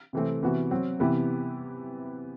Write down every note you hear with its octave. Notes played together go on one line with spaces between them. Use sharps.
C3 E3 A3 C4
C3 E3 B3 F#4
F#3 C4 F#4
C3 E3 B3 E4 G4